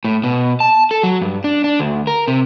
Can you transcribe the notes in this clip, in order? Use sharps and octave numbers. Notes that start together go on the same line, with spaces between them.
A2
B2
A5
A4
F#3
G2
D4
D4
D2
A#4
C3